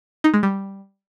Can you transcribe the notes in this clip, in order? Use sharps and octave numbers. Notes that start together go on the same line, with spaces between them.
D#4
G#3
G3